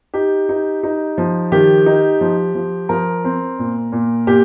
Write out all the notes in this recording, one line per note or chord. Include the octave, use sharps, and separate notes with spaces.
D#4 G4
D#4
D#4
F3
D#3 G4
D#4
F3
F3
F3 A#4
C4
A#2
A#2
A#2 G4